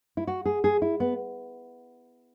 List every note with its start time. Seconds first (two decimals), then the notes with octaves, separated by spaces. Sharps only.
0.17 E4
0.27 F#4
0.46 G#4
0.64 G#4
0.82 E4
1.00 B3